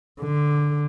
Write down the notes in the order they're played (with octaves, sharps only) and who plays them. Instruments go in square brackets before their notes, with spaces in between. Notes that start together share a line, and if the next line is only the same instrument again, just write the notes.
[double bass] D3